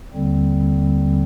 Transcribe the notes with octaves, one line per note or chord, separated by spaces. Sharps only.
D#2 D3 G3 C4